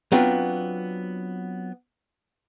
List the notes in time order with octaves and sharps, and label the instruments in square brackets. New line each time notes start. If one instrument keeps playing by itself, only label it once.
[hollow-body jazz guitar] F#3 B3 C4 D4 F4